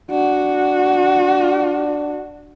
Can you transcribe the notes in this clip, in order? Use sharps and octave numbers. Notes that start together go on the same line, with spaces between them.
D4 F#4